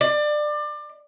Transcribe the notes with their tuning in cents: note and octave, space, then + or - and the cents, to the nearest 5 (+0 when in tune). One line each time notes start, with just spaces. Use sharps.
D5 +25